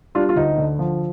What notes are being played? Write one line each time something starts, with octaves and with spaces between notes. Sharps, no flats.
G3 D4 F4
F4
D2 D#4
D3
F3